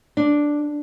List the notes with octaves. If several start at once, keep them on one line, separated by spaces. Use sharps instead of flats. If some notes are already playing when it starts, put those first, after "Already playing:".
D4